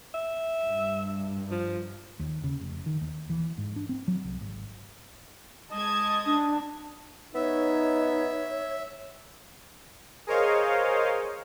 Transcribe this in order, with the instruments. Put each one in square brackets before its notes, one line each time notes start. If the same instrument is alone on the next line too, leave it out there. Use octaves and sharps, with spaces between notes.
[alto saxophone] E5
[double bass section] G2
[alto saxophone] F3
[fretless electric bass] D#2
C#3
F1
D#3
D#2
E3
G#2
D4
C4
F#3
C2
G#1
[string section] G#3 A5 G#6 [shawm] D#5
[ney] D4
[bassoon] B3 [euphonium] D#4 [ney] C#5 [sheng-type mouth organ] E5
[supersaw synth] G#4 A#4 C5 C#5 D#5 F5